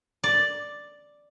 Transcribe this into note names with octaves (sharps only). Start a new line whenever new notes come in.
D5